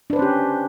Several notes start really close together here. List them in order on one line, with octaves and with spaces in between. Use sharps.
D4 B4 C5 C#4 G4